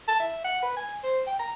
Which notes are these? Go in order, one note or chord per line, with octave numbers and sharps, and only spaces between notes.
A5
E5
F#5
B4
G#5
C5
G5
A#5